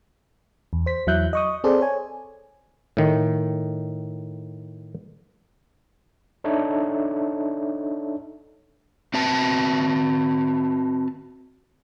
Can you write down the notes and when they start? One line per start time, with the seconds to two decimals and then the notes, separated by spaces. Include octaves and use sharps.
0.73 E2
0.86 C5 B6
1.07 E2 F#3 E4 E5 F#6 G6
1.33 D#5 C#6 D#6
1.64 C4 G#4 A4 C5 D5
1.81 C#5 G#5
2.97 A2 D#3
6.44 D4 D#4 A4 C#5 E5
9.14 C4 F#4 B4 A5